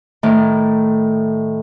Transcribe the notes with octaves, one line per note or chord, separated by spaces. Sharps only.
A2 D#3 A3